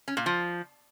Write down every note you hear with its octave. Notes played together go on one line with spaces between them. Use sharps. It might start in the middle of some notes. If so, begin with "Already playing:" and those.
C#4
A#2
F3